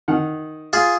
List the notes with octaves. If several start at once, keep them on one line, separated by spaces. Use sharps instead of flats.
D#3 F#5 F6
F4 G#4